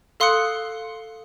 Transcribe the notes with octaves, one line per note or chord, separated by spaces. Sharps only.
A4 F5 C6 D#6 F#6 C#7